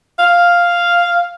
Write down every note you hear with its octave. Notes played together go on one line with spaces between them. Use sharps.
F5